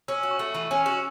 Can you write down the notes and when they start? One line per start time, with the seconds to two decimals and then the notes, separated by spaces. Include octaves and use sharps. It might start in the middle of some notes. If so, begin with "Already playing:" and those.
0.08 C#4 E6
0.23 F#4
0.31 C#6
0.39 A3
0.54 E3
0.71 C#4
0.86 F#4